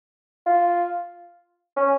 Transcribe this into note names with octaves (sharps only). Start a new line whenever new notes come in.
F4
C#4